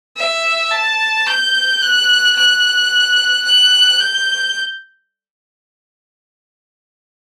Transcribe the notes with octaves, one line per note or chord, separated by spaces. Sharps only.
E5
A5
G6
F#6
F#6
F#6
G6